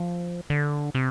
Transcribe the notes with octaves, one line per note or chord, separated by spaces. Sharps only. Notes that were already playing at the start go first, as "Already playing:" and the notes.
Already playing: F3
D3
C3